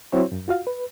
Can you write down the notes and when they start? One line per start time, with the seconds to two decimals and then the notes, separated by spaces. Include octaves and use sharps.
0.12 F#3 C4 E4 F#4 C5 C#5
0.32 F#2
0.48 F4 F#4 F5
0.67 B4